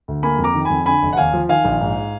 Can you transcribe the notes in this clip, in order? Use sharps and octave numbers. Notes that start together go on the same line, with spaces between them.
D2
A#3 G#5 B5
F2
A#5 D6
D#3
F2 G#5 B5
D3 G#5 B5
F1
F#5
D#2 F5 G#5
F3
D#3 F5 G#5
A#1
G#2